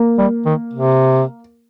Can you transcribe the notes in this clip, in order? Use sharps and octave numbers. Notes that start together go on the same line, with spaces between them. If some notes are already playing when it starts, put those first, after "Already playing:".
Already playing: A#3
G3
D#3
C3